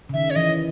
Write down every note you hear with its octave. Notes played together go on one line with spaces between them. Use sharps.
C#3
D#3 E5
C#5
E3 D#5